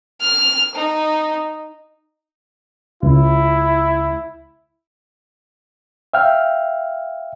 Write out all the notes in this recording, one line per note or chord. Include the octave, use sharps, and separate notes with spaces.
F6
D#4
C#2 E4
E5 F5 G5 F6